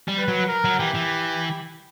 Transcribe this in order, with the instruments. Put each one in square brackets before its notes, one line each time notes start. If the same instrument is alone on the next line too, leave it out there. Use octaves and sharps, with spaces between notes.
[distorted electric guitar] G3
[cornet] B4
[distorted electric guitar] F#3
[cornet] A#4
[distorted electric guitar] F#3
[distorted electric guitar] E3 [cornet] G4
[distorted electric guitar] E3